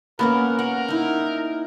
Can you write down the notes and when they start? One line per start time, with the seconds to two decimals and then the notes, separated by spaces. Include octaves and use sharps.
0.19 A#3 B3 C#4 A#4 F#5
0.59 A#4 F#5
0.88 D#4 E4